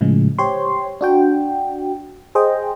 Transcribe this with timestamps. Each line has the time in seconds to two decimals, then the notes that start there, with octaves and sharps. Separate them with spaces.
0.01 A2 C#3 F3 G#3
0.38 G4 C5 C#5 C6
1.01 D4 F#4 G5
2.35 G#4 C5 D#5 G5